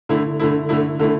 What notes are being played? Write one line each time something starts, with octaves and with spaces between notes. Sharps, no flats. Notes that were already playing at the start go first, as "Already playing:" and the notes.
D3 A3 E4
D3 A3 E4
D3 A3 E4
D3 A3 E4